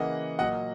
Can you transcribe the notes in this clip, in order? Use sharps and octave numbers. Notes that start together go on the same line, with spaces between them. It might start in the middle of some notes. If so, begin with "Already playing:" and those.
Already playing: C#3 E3 A#3 D#5 F#5
A#2 F#3 A#3 D#5 F#5